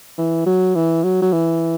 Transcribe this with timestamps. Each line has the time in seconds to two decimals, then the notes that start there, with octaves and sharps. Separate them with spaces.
0.18 E3
0.46 F#3
0.75 E3
1.04 F#3
1.22 F#3
1.32 E3